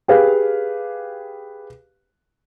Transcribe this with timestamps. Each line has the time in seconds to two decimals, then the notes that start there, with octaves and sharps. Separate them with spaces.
0.08 G4 G#4 B4 F5